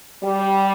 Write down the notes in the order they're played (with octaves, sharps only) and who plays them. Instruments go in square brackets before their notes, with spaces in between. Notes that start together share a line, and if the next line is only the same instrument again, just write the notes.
[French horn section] G3